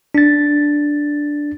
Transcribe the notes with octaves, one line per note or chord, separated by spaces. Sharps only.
D4 A6